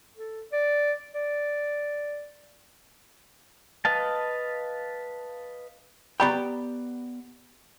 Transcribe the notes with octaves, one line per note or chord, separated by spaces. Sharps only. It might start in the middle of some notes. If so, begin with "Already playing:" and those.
A4
D5
D5
B4 D#5 F5 A5
B3 G4 D5 G5 A#5 B5